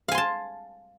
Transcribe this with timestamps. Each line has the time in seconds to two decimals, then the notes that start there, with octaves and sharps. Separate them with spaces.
0.08 F5
0.11 G#5
0.15 C6
0.18 A5